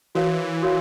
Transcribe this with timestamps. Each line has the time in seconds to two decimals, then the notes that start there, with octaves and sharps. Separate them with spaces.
0.15 E3 F#4 A#4 C#5 F5
0.62 F#4 A#4 C#5 F5